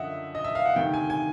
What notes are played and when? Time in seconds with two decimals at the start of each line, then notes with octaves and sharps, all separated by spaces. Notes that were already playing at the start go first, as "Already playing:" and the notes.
Already playing: F#2 D3 F3 D#5 E5 F#5
0.35 D#5
0.44 E5
0.55 F5
0.66 F#5
0.76 D2 C3 D#3 G5
0.94 G#5
1.10 G#5